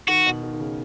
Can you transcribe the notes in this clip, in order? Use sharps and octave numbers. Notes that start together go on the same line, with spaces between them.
D#3 F#4
B2
D#3
D#3
C#3